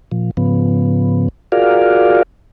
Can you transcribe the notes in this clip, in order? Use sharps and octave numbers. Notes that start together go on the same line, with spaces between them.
A#2 F3
G#2 C#3 F3 B3
F4 F#4 G#4 A#4 D5 F5